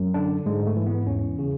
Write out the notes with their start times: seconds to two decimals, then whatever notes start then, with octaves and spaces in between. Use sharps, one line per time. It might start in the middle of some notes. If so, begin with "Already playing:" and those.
Already playing: F#2
0.14 D3 D4
0.46 G#2 G#3
0.66 A3
0.76 E3
0.87 B3
1.07 E2 C#4
1.39 C#3